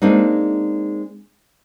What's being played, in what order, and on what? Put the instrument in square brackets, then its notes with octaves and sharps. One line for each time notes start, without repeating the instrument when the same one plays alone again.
[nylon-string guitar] G#3 A#3 C4 D4 D#4